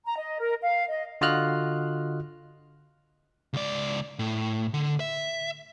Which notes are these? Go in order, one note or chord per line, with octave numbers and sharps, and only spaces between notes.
A#5
D#5
A#4
F5
D#5
D3 F4 F#4 D#5 F6 F#6
C#2 D5
A2
D3
E5